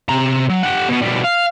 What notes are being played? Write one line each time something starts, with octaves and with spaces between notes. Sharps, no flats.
C3 A#5
F#3
G4 F#5
B2 B3
B2 G3
F5